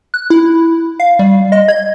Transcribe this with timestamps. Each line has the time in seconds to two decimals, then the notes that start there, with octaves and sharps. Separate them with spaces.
0.14 F#6
0.30 E4
1.00 F5
1.19 G3
1.52 D#5
1.68 G#6